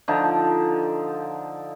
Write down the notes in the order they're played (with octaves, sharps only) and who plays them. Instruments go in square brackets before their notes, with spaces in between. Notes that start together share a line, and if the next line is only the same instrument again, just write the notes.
[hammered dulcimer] D3 F3 D#4